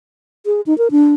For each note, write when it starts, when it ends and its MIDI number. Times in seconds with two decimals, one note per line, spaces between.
0.46 0.61 68
0.66 0.77 63
0.78 0.88 70
0.91 1.15 62